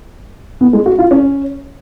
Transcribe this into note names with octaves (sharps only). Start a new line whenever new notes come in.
B3
G#3
F#4
F4
C#4